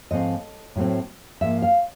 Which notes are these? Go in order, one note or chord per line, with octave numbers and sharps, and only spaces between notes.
G#2 F3 A3 C4 D#5
A2 F#3 A3 C4
G#2 F3 A#3 E5
F5